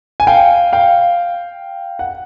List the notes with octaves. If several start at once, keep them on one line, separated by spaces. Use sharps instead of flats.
G#5
F5 G5
F5 G5
F#5